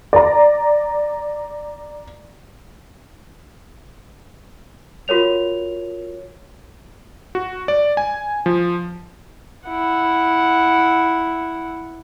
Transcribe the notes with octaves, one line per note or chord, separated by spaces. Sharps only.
D5 A#5
F4 F#4 A#4 C#5 F7
F#4
D5
G#5
F3
E4 F#5